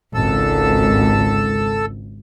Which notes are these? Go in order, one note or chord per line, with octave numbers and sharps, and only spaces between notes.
G#1 C#2 A4 E6